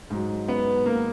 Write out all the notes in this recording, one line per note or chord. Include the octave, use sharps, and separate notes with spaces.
G#2 F#3
B3
A#3